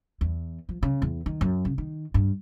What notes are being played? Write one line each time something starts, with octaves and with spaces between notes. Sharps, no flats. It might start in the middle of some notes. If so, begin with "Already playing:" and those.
E2
F3
C#3
E2
D#3
F#2
C#3
D#3
G2